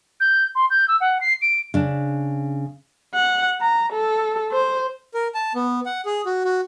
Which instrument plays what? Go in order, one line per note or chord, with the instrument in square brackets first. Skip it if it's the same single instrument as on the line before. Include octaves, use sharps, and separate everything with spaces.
[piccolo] G6
C6
G6
E6
F#5
C7
D7
[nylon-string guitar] C#3 D4
[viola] F#5
A#5
A4
C5
[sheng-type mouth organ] A#4
A5
B3
F#5
G#4
F#4
F#4